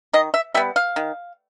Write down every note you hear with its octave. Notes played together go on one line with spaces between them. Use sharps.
D#3 D#5
E5
G3 B3 E5
F5
D#3